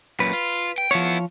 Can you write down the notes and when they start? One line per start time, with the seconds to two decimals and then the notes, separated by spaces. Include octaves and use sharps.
0.20 F#2 A#2 B4
0.33 F4
0.78 G5
0.91 F3 B3 E4 C#5